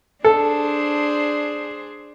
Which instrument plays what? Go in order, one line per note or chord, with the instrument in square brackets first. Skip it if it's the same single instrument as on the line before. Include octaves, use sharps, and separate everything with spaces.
[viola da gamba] D4 G#4 C5 [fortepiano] A4